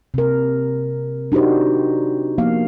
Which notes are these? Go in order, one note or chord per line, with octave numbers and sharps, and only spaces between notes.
C3 A#4
D4 D#4 F#4 G4 C5
F3 A#3 B3 F5